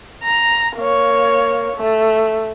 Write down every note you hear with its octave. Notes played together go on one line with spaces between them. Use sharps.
A#5
A#3 C#5
A3